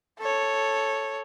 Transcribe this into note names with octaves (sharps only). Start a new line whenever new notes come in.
A4 C#5